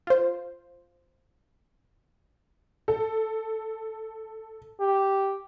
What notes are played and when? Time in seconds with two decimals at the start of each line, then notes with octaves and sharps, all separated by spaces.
0.07 F4 C5
2.88 A4
4.80 G4